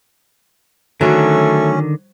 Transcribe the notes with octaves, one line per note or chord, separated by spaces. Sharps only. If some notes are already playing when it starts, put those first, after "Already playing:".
D3 D#3 F#3 A3 C#4